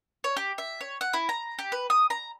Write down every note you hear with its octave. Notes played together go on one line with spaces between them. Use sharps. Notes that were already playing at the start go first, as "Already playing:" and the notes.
C#5
G4
E5
C#5
F#5
E4
A#5
G4
B4
D#6
A#5